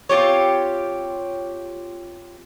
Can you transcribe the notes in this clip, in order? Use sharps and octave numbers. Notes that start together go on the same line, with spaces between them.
C4 F4 G4 C#5